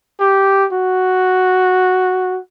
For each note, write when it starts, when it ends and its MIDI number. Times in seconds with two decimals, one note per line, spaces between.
0.20 0.65 67
0.73 2.39 66